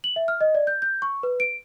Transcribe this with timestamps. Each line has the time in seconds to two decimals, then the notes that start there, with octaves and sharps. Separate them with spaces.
0.04 F#7
0.16 E5
0.28 F6
0.41 D#5
0.55 D5
0.67 G6
0.82 G6
1.02 C#6
1.23 B4
1.40 D7